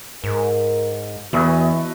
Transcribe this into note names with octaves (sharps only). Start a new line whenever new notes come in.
G#2 A#4
E2 E3 A3 F#4 B4 D#5